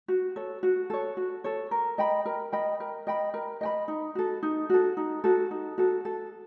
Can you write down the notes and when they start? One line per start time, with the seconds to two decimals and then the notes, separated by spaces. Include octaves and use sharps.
0.08 F#4
0.36 A4 C#5
0.63 F#4
0.90 A4 C#5
1.17 F#4
1.44 A4 C#5
1.71 A#4
1.98 D#5 G5 B5
2.26 A#4
2.52 D#5 G5 B5
2.80 A#4
3.07 D#5 G5 B5
3.34 A#4
3.61 D#5 G5 B5
3.88 D#4
4.15 F#4 A4
4.43 D#4
4.70 F#4 A4
4.97 D#4
5.24 F#4 A4
5.51 D#4
5.78 F#4 A4
6.05 A4